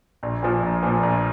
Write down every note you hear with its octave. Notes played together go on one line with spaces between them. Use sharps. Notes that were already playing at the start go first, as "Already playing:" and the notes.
A#1
A#2 F3
A#1
A#2 F3
A#1